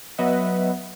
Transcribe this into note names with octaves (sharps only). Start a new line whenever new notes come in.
F#3 B3 B4 D#5 E5 F#5